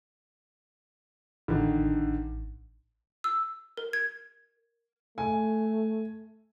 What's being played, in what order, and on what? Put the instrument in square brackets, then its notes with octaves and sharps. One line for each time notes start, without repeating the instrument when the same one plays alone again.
[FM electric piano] A1 [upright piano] D3 D#3
[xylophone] E6
A#4
G#6
[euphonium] A3 [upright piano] G#5